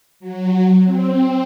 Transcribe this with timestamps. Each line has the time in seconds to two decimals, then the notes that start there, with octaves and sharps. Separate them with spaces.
0.20 F#3
0.85 C4